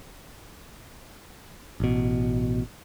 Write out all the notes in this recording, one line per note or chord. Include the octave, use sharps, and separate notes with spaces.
A1 B2